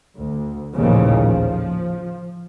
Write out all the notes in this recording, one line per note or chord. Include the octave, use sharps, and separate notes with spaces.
D2
A1 D#2 A#2 C#3 F3
F3